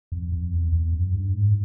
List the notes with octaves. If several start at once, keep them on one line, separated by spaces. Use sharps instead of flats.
F2
F2
E2
E2
F#2
G2
G#2